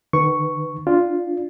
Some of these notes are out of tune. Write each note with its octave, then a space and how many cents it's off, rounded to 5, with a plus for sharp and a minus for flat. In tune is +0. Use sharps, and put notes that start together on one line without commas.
D#3 -35 B4 +10 C#6 +0
D4 +0 F4 +0